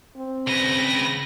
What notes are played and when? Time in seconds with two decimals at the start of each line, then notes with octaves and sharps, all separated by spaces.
0.17 C4
0.47 C#3 B4 A#6